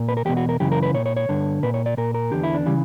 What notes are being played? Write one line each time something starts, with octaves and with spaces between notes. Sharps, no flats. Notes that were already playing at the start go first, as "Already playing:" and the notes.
Already playing: A#2
B4
A#4
E2 B2 G4
F#4
A#4
F#2 C#3 E3 G4
A#4
B4
A#2 C#5
C#5
C#5
G2 D3
A#2 B4
C#5
D5
A#2 A#4
A#4
E2 D3 G4
E4
D4
C#3 E3 G3